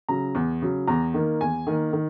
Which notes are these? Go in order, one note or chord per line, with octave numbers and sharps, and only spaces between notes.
C#3 F#3 A#5
E2
C#3 F#3
E2 A#5
D#3 A#3
E2 G#5
D#3 A#3
D#3